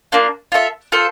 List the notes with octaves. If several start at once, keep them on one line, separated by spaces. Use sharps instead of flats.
A#3 D4 F4
F4 A4 E5
F4 A4 C5